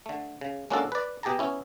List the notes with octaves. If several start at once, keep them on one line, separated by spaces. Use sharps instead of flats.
D3 A3
C#3
G#3 A#3 C#4 D4 F#4 A4
B4 D5
B2 G4 G#4 A5 A#5
B3 C#4 E4